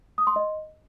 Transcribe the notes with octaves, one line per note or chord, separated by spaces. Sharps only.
D#6
C6
D#5